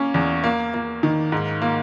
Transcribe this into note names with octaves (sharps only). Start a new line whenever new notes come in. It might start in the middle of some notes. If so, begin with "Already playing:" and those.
Already playing: A#3 C#4
E2
A#3
A#3
D#3
G#2
A#3